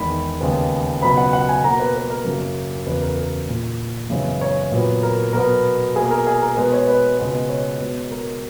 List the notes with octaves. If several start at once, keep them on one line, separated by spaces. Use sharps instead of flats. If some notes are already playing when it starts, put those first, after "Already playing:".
Already playing: E2 D#3 G#3 B5
D#2 C#3 G#3 B3
C#2 B2 F#3 B3 B5
F#5
F#5
G#5
B2 A#3 A#5
B4
B4
A#4
F#2 C#3 F#3 A#3
E2 C#3 F#3 B4
A#4
A#4
A#2 A#3
F#2 C#3 E3 G#3 B3
C#5
A#2 F#3 B3
A#4
B2 F#3 B3 A#4
B2 A#3 G#4
G#4
A#4
G#4
A#4
B2 G#3 B3 B4
C#5
B4
C#2 B2 G#3 B3
C#5
B2 G#3 B3
A#4